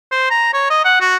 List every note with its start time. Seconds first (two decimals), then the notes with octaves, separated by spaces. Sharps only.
0.11 C5
0.30 A#5
0.53 C#5
0.70 D#5
0.85 F#5
1.01 F#4